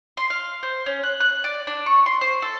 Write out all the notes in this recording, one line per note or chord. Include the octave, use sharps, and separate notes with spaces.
C6
F5
C5
C#4
F#6
F#6
D5
D4
C#6
C6
C5
A4